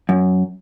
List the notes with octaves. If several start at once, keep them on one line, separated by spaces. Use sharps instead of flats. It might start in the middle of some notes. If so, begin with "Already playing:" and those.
F#2